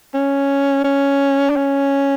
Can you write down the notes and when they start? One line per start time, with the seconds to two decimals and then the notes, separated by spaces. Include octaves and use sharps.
0.14 C#4
0.84 C#4
1.50 D4
1.56 C#4